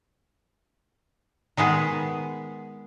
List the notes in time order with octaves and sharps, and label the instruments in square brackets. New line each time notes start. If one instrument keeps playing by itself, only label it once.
[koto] D#3 G#3 B3 G#4